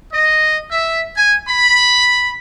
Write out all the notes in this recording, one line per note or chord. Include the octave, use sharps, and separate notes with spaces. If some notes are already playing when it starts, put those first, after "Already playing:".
D#5
E5
G#5
B5